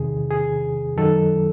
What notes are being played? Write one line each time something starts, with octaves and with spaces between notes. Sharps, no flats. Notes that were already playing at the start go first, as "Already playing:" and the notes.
Already playing: E2 C3 D#3 G#4
G#4
F#2 D#3 F#3 A4